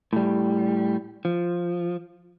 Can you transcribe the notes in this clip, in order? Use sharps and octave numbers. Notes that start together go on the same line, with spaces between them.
A2 G3
F3